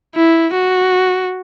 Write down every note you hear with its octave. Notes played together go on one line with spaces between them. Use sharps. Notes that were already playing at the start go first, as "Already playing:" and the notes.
E4
F#4